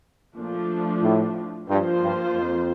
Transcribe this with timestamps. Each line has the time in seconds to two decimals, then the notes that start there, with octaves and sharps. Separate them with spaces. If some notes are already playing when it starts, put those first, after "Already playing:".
0.36 A#2 F3 A3 D4
1.02 A2
1.69 G2 F3 A#3 F4 C5
2.02 G2
2.35 F2